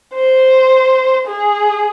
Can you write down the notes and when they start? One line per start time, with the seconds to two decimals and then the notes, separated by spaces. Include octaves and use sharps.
0.14 C5
1.27 G#4